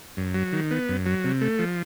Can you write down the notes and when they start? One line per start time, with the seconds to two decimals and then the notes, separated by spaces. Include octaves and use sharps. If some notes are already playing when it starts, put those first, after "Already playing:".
0.17 F#2
0.34 F#3
0.53 D#3
0.71 B3
0.89 F#2
1.06 F#3
1.24 C3
1.41 A3
1.59 F3